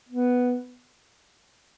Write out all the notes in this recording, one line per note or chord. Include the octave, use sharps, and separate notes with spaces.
B3